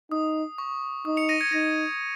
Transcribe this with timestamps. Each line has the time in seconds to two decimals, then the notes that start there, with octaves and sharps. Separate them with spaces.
0.11 D#4 D#6
0.58 C#6
1.05 D#4 D#6
1.17 C#7 F7
1.29 A#6 D#7
1.41 G#6 C#7
1.52 D#4 A#6 D#7